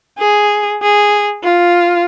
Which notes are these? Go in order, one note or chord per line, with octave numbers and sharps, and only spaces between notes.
G#4
G#4
F4